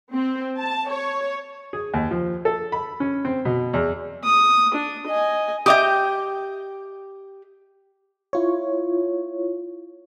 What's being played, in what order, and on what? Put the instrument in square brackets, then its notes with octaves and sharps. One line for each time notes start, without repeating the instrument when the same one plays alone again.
[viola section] C4
A5
C#5
[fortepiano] G#4
D#2
F3
A4
B5
C#4
C4
B2
E2
[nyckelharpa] D#6
D4
D#5 G#5
[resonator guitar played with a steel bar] G4 D#5 G5 [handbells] E5 D6 D#6
[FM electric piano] E4 F4 C#5